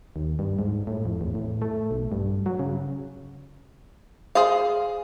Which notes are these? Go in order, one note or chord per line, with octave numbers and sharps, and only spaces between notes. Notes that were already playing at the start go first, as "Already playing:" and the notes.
D#2
G2
G#2
A2
F2
E2
A2
A3
B1
G2
F#3
C#3
G#4 C5 F5